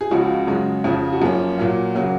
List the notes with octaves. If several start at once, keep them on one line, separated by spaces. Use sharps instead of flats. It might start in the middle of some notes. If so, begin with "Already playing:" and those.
G#4
C#2 C#3 F3 F#4
F#2 C#3 G#3
F2 C#3 F3
F#4
F#2 F3 A#3 C#4 G#4
A#2 F#3 A#3
C#3 F#3 A#3